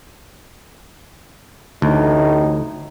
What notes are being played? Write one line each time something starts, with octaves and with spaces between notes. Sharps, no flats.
A1 D2 A2 D#4